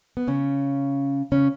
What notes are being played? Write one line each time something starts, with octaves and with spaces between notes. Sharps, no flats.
B3
C#3 C#4
C#3 C#4